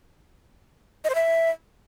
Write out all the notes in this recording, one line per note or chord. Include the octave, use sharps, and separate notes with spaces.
D#5
C5
E5